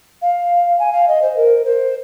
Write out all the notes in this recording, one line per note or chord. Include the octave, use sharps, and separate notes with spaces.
F5
G#5
F5
D#5
C5
A#4
C5